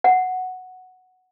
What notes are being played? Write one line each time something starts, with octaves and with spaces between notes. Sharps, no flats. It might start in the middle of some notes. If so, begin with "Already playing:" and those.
F#5